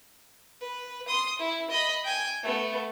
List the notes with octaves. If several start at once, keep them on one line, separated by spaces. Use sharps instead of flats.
B4
C6 D#6
E4
D#5 B5
G5 G#5
A3 B3